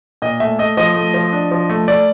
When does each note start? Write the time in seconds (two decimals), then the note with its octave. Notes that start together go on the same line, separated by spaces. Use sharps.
0.22 A#2 D#5
0.40 A3 E5
0.59 A3 D#5
0.77 F3 D#5
0.95 A3
1.14 F3
1.33 D4
1.51 F3
1.70 A3
1.88 A3 D5